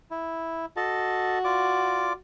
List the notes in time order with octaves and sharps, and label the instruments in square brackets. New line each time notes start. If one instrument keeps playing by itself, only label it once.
[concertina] E4
[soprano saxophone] F#4 [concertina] A4 D#5 A5
[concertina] F4 D5 D6